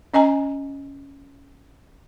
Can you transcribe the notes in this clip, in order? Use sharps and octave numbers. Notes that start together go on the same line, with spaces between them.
C#4 D#5 G#5 A#5